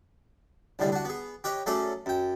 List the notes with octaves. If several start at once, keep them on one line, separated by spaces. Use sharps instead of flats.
C2 A2 D3 G3 G#3
D4 F#4
B3 G#4
G4 B4 C#5 D#5
F#3 A3 C#4 G#4 A4 D5
F#2 G5